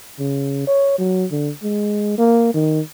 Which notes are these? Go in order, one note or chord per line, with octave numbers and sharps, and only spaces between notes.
C#3
C#5
F#3
D3
G#3
A#3
D#3